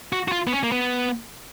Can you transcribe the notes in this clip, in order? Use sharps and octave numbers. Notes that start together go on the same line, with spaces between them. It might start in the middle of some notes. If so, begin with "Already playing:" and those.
F#4
F#4
F4
B3
C#4
A#3
B3